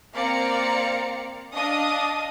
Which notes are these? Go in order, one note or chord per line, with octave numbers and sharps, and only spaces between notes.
A#3 C4 D5 F5 A#5 C#7
D4 D#5 F5 D#6